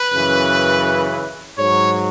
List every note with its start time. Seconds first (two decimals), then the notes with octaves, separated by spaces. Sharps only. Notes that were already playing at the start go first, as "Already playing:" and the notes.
Already playing: B4
0.13 F#2 C#3 E3
1.58 G#2 F#3 C#5